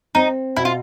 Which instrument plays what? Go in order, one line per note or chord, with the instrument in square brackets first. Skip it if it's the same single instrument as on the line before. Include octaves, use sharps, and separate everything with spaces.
[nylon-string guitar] C4 [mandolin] D#4
[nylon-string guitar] B2 [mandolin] E4
[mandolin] F4